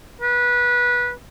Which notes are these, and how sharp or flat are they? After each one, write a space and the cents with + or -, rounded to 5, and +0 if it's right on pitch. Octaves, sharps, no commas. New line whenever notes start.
B4 -20